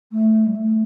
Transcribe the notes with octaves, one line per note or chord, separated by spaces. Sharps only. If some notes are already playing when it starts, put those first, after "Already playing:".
A3
G3
A3